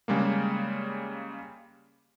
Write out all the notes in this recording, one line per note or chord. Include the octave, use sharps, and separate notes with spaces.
C#3 G3 G#3 A#3